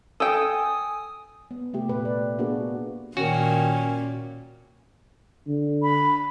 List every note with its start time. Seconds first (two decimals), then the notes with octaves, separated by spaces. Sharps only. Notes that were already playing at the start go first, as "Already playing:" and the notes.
0.20 A4 G5 G#5 D#6
1.51 B3
1.73 C3 A3 G4
1.88 A#2 B4
2.05 D5
2.39 A#3 B3 D4 F#4 G#4
3.17 A#2 D#3 C#4 F#4
5.47 D3
5.82 B5